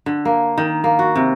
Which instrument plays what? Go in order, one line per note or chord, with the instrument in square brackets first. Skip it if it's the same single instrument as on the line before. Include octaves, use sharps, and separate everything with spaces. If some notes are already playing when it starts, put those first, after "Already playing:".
[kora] D3
A#3
D#3
A#3
F#4
C3